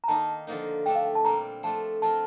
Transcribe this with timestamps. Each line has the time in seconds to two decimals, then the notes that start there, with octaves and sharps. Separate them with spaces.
0.04 A#5
0.08 D#3 A#3 D#4 A5
0.47 D3 F3 A#3 D#4
0.86 A3 D4 A4 G5
0.95 F5
1.05 G5
1.15 A5
1.25 A#2 G3 C4 A#5
1.63 F3 A3 D4 F4 A4 A5
2.02 F3 C4 F4 A#4 A5